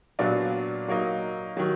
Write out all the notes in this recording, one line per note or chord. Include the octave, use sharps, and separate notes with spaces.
A#2 F#3 B3 D4 F4
F#3 A#3 D#4
D#3 F#3